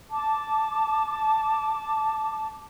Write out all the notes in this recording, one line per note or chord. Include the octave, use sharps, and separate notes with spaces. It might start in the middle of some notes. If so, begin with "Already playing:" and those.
A5 D6